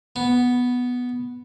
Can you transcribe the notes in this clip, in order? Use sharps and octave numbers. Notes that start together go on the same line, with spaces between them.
B3